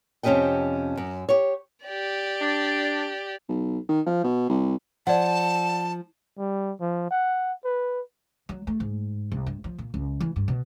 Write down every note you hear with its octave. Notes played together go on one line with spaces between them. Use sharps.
F2 C3 C#4 G4 D#5 G5
F#2
G4 C#5
G4 D5
D4
B1
D#3
F3
B2
C2
F3 D5 F#5 A5
G3
F3
F#5
B4
F#3
A3
G#2
C2
G2
F3
A#2
C#2
E3
G2
B2